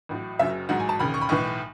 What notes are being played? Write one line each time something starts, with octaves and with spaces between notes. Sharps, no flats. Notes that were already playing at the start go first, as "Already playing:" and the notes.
A1 A2 F#3
F#1 F#2 C#3 F#3 E5
A1 G#2 F#3 F#5
G#5
A5
E1 D#2 C#3 B5
C#6
B5
B1 A2 E3 C#6